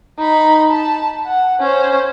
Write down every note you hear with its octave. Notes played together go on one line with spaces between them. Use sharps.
D#4 B5
A5
F#5
C#4 C5